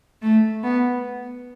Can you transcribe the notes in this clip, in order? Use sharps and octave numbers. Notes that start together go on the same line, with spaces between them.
A3
B3